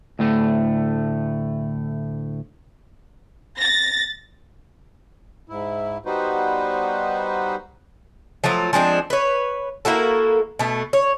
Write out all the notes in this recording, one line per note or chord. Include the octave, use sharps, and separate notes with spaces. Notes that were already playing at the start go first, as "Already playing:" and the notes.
D2 A2 A3
A6 A#6
G#2 E4
G3 B3 D#4 F#4 B4 C5
F3 F#3 A3 A#5
F3 G#3 C4 D4
B4 C#5
A#3 E4 F#4 A4
B2 A3
C#5